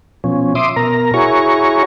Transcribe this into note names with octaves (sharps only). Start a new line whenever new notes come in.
B2 F3 C#4
E5 C6 D6 D#6
B2 A#4 A#5
E4 F#4 G#4 C#5 A#5 C#6